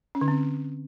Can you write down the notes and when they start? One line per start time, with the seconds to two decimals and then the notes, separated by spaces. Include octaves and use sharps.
0.15 C#4
0.21 D3
0.28 C4